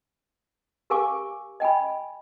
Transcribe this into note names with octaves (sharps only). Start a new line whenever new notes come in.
G4 A#4 F5 G#5 C#6 D6
D#5 G5 G#5 B5